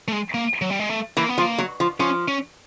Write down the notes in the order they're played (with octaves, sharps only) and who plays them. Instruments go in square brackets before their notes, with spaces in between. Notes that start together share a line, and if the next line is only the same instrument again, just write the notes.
[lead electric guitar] A3
G#3
A#3
F#3
G3
G#3
A3
[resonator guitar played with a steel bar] E3 [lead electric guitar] A#3
[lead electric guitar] B3
[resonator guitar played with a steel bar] F3
[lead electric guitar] A#3
[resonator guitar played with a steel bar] F#3
F3
[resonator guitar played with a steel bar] F3 [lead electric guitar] C#4
[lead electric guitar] C#4